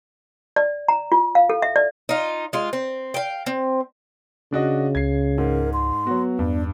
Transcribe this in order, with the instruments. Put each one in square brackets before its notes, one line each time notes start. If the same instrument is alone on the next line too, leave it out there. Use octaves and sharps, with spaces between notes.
[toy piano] D5
A#5
F4
F5
A4
E5
D5
[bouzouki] D#4 F4
G#3 F4
C4
F5 G5
C4
[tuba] C#3 [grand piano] D4 F#4 D#5
[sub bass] C#2 [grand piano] G#6 C7
[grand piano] G#2 [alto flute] A#4
[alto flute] C6
[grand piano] F#3 F#4 [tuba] B3
[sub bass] E2 [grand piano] G2 [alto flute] D4